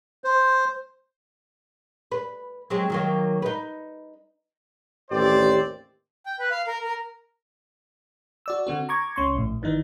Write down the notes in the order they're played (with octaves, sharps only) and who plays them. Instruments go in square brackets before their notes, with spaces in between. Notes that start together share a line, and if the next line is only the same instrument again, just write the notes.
[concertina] C5
[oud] B4
F#3 G#3 C4
D#3 F#3 A#3
D#4 B4
[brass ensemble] A1 D#2 C4 G4 C5 D5
[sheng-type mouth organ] G5
B4
F5
A#4
A#4
[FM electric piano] F#4 D5 E6
D3 C4 F#4
A#5 C#6 D6 G#6
C#2 C#4 C6 C#6
A#1 A2
G#1 D#3 E3 D#4